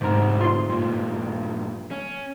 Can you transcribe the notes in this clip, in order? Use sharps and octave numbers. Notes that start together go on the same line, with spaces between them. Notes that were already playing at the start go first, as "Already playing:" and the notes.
D2 G#2 C3 A#4
F4 C6
G2 A#2
C#4